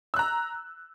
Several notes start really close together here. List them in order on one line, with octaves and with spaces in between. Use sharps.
E6 F#6 A#5